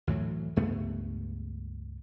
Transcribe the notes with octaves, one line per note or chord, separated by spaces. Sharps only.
D2 A2 E3 F#3
C#2 G2 A3 B3